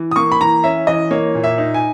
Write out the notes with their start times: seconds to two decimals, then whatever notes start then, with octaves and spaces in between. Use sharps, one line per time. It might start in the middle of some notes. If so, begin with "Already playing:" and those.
Already playing: E3
0.11 D#6
0.16 A#3 C#6
0.32 B5
0.41 E3 A#5
0.64 C#4 E5
0.87 E3 D#5
1.11 A#3 C#5
1.35 A#2
1.44 E5
1.58 D#4
1.74 G#5